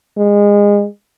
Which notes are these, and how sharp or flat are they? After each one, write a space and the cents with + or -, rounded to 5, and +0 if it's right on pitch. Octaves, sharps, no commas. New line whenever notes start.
G#3 -25